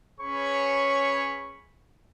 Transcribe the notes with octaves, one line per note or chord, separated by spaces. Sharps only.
C#4 G#4 B4 C#5 B5 C#6